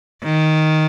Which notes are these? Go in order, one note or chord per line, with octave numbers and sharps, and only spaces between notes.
D#3